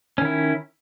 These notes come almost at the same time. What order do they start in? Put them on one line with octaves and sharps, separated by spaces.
C#4 D#3 E4